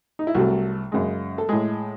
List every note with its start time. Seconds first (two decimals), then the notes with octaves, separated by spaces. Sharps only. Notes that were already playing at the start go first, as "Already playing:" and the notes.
0.19 D#4
0.27 E4
0.35 C2 C3 F#3 A3 F#4
0.92 F#2 C#3 G#3
1.38 A4
1.49 A2 G#3 G#4